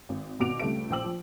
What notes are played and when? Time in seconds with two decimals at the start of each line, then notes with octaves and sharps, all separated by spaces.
0.09 G#1
0.40 G#1 B2 F#4 D6 D7 F7
0.59 C#2 G3 A3 D7
0.90 A#1 C5 G5 D6 E6 F#7
1.04 F3